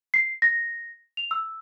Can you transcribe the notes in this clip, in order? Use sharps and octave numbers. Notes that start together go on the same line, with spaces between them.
C7
A#6
F7
E6